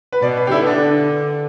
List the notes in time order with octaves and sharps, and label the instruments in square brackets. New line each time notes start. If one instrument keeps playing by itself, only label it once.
[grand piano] B4
[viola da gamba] B2 [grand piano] D5
[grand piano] B4
G4
[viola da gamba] D3 [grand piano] E4
[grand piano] B3
D4